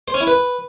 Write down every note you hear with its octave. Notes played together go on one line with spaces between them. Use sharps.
C5
C#4
E4
B4